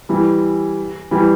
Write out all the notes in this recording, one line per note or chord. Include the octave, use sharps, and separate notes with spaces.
E3 G3
E3 G3